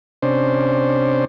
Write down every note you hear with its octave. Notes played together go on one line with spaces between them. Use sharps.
C3 C#4 D4 C5